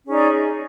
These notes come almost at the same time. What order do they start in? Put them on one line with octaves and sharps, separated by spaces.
C#4 G#4 D#4 D5